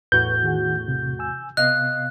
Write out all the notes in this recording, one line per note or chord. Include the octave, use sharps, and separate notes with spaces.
E2 A2 F#4 B4 G6
D#3 G#4 F#5
C3
G#5 E6
C3 B3 D#5 F5 F#6